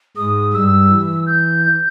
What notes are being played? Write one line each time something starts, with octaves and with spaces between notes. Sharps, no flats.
G#2 G#3 D#6
G2 G3 E6
E3
G6